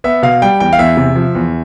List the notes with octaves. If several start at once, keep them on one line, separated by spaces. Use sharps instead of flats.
B3 E5
B2 F5
G3 G5
E2 G5
F5
E2 E5
C3
F3
E2